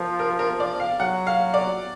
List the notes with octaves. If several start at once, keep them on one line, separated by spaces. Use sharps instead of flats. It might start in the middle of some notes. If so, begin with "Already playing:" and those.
Already playing: F3 A#4
A#4
A#4
D5
F5
F#3 F#5
F5
D5